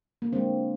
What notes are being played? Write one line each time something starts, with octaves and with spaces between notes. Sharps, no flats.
A#3
D3 G#3 C4